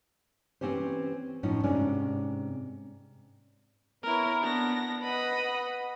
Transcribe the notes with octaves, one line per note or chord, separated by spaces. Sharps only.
E3 G#3 C4 C#4 G4 C5
A2 F3 C#4 D#4
G#2 C3 C#4 D4
B3 E4 A#4 C#5
B3 D4 A#6
B4 D#5 F#5 B5